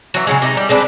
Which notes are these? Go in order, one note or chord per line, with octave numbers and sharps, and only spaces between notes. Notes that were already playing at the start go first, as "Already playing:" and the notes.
E3 F#3
C#3 F#3 G#3
C3 D#4
G3
G#3 C4 D4 B4